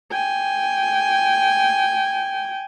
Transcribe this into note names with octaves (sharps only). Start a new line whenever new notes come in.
G5 G#5